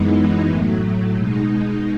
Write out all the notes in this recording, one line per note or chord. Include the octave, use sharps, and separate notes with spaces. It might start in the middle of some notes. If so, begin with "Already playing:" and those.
Already playing: F#2 E3 G#3 B3 D#4
A2 F#3 A3
B2 G#3 D#4